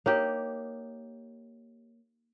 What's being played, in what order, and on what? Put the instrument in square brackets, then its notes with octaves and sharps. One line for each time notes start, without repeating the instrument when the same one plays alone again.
[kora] A#3 D#4 G4 [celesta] C#5